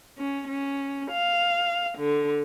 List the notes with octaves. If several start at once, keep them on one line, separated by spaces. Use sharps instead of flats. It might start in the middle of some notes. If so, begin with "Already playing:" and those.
C#4
C#4
F5
D3